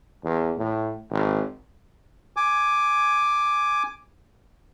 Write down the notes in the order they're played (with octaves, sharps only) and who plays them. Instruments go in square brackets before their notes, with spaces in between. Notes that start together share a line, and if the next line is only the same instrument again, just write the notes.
[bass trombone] E2
A2
G#1
[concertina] G#5 D6